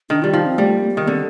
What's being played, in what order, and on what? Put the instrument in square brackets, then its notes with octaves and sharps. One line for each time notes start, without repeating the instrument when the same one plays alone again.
[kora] D#3 [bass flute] D4
[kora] G3 [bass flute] F4
[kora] F3 [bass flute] D#4
[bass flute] C4
[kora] G3 [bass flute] A3
[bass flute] A#3
A#3
[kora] D#3
[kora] D3 [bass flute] C4